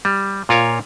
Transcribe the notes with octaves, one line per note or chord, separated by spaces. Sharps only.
G3
A#2 F4 A#4 C#5